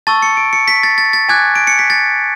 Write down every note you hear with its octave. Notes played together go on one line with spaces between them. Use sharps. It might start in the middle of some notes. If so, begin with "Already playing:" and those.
A5 C#6 E6 A6
C#7
D7
C#7
B6
A6
A6
A6
G#5 D6 F#6 G#6
D7
C#7
B6
A6